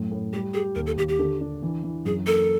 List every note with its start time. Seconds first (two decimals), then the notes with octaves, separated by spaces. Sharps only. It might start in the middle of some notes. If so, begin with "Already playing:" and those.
Already playing: F#2 A2
0.11 A2
0.33 G3 G4
0.54 G4 G#4
0.75 D#2 A#4
0.86 A4
0.97 D#2 G4
1.09 G4
1.19 D3
1.41 D4
1.62 E3
1.83 E3
2.05 F#2 G#4
2.26 A#3 A4